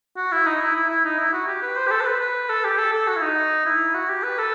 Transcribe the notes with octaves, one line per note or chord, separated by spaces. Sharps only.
F#4
E4
D#4
E4
E4
E4
D#4
E4
F#4
G4
B4
C5
G4
A4
C5
B4
B4
A4
G4
A4
A4
F#4
E4
D#4
E4
F#4
G4
B4
A4